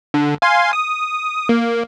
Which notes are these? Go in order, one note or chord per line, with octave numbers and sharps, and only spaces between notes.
D3
F5 G#5 C6
D#6
A#3